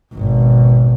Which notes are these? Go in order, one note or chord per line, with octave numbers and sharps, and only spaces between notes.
G#1 B2